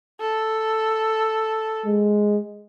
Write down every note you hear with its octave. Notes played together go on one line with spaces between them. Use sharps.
A4
G#3